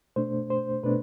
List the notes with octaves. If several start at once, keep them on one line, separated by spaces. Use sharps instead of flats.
B2 A3 D4 C5
C5
B2 A3 D4 B4